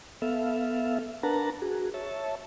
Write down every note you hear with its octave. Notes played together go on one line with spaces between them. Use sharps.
B3 A4 E5 F5
D4 A#4 B4 F#5 A5 A#5
F#4 G#4
C#5 E5 A5